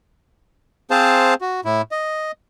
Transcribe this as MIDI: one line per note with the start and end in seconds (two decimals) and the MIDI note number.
0.91 1.34 60
0.91 1.34 68
0.91 1.34 72
0.91 1.34 77
0.91 1.34 81
1.41 1.60 66
1.65 1.82 45
1.65 1.82 64
1.91 2.31 75